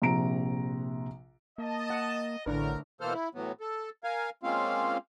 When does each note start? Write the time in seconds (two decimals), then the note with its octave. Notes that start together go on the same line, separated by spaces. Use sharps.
0.02 A#1 C3 A#5 D7
1.58 A#3 D#5 A5
1.90 F#5
2.46 A1 A2 D3 A3 D4 A#4 B4
3.01 B2 E3 A#3 A4 C5 F6
3.13 E4
3.35 A2 E3 F#3 B3
3.61 A4
4.04 A#4 F5 G#5
4.43 G#3 A#3 C4 C#4 F4 F5